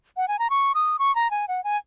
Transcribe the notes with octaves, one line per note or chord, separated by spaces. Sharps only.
F#5
G#5
A#5
C#6
D#6
C#6
A#5
G#5
F#5
G#5